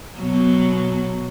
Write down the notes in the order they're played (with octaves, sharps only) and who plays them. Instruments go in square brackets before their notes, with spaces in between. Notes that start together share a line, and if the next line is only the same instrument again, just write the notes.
[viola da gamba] B2 F#3